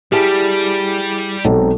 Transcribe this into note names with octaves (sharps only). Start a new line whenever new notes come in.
G3 E4 G4 G#4 A5 F6
B1 G#3 C4 D#4 A4